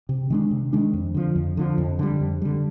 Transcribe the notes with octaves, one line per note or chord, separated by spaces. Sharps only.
C3
D#3 G#3 D4
C3
D#3 G#3 D4
F2
D3 F3
F2
D3 F3
F2
D3 G3
F2
D3 G3